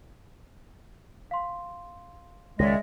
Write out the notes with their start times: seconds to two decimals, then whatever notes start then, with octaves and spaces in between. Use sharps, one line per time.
1.31 F5 C6
2.59 C#2 D#3 G#3 C#5 D5 E5 A#6